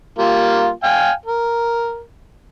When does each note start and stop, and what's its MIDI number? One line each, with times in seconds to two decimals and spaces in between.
0.19 0.69 55
0.19 0.69 58
0.19 0.69 65
0.83 1.11 77
0.83 1.11 79
0.83 1.11 80
1.26 2.01 70